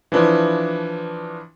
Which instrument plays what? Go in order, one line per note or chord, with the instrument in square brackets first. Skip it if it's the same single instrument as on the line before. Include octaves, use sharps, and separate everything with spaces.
[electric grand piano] E3 F3 D4 E4